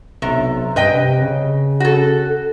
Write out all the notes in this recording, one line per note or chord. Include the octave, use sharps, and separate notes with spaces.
B1 C3
G2 B4 D#5 G5
C3
C#3
F#4 A4